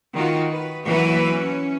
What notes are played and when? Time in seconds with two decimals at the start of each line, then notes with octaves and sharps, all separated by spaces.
0.13 D#3 F4 F#4
0.52 B4
0.84 E3 F#3 A#3 F#4 B4 E5
1.30 C#4